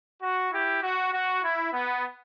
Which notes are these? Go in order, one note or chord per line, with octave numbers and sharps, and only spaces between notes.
F#4
E4 G4
F#4
F#4
E4
B3